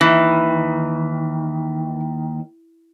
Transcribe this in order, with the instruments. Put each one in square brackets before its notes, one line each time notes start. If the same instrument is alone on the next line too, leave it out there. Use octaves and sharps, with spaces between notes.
[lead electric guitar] D#2 D#3 [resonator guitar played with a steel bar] E3